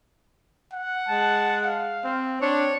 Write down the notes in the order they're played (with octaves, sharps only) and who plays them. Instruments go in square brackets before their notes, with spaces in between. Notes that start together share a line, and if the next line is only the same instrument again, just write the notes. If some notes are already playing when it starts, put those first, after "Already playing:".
[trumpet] F#5
[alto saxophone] G#3 [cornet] A5
[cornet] F5
[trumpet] C4
[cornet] C4 [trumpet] D4 [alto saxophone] C#5